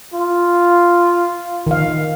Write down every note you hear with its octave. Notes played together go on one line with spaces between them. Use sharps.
F4
D#3 F5